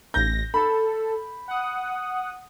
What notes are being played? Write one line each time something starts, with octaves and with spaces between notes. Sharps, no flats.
A1 G6 A#6
A4 B5
F#5 D#6